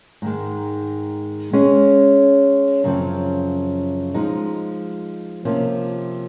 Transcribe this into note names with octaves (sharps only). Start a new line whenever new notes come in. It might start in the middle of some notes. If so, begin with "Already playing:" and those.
G#2 D#3 G#3
G#3 C#4 G#4 D#5
F#2 C#3 F3 C4
F3 G#3 D#4
C3 F3 A#3 C#4